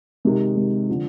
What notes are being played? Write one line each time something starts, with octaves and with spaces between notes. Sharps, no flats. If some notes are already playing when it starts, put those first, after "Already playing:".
C3 D#3 G#3
C3 D#3 G#3
D3 F3